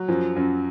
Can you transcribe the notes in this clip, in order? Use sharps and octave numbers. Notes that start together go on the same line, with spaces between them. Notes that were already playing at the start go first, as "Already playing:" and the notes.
Already playing: F#3
F#2 F3
F#2